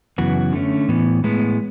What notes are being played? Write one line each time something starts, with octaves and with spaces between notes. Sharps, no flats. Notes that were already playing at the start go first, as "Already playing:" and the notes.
F#2 C#3 E3 B3 F#4
D3 A3 C#4
A2 E3 B3
A2 G#3 B3